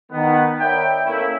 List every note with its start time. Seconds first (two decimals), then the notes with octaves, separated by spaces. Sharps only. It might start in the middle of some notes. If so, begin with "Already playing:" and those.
0.12 D#3 B3
0.59 A#4 B4 C#5 D5 E5 G5
1.06 A3 A#3 C#4 E4